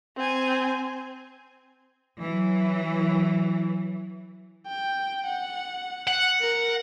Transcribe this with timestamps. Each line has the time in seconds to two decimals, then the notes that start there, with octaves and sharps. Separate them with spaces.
0.16 C4 G#5
2.20 E3 F#3
4.67 G5
5.26 F#5
6.08 F#5
6.41 A#4